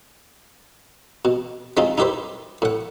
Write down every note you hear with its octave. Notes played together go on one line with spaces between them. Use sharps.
B2
G#3 C4 D#4 F4
D#4 E4 G4 B4 C5
A2 F#5